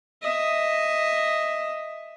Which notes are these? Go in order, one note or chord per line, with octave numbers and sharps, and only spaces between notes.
D#5 E5